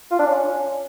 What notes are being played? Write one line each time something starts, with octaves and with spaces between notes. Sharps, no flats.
F4
D4
C#4